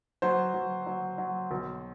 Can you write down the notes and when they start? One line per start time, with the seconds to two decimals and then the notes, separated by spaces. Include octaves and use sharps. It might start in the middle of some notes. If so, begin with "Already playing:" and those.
0.22 F#3 C5
0.54 F#3
0.86 F#3
1.18 F#3
1.51 B1